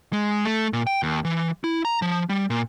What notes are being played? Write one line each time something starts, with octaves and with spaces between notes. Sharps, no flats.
G#3
A3
A#2
G5
D#2
E3
E4
A#5
F3
G3
A#2